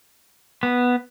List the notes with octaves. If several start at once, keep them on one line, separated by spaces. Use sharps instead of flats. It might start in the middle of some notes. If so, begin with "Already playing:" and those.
B3